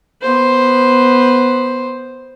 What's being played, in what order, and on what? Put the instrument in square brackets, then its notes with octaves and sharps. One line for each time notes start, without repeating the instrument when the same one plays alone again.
[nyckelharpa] B3 C5